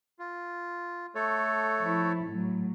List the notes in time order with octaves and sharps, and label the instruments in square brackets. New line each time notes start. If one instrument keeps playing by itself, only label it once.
[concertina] F4
A3 A4 C#5
[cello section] F3 E4
A2 F#3